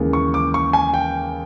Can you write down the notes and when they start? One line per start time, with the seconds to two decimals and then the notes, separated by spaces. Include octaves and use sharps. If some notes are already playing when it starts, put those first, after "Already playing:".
Already playing: D#2 C#3 E3 G#3
0.13 C#6
0.34 D6
0.54 C#6
0.73 G#5
0.94 G5